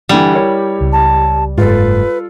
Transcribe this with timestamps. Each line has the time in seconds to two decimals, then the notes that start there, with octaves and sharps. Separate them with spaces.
0.09 D3 E3 G3
0.32 E4 A#4 C#5
0.81 C#2
0.92 A5
1.58 F#1 G#2 F4 A4 B4